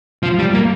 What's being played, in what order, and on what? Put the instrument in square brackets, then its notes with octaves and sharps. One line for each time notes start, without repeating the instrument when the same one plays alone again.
[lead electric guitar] F3
G3
A#3